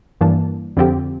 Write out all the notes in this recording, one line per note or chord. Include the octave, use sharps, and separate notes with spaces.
G2 E3 A#3 D4
F2 D3 F3 C4 G4